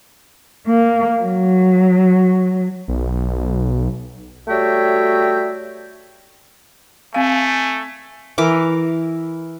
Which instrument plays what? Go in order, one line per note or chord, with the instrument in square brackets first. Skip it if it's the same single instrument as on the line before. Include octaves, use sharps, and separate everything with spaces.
[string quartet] A#3
F#3
[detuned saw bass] B1
[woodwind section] G3 A3 F#4 C#5 E5 G5
[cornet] A3 [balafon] C4 F5 [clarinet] G#5
[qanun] E3 A#4 D6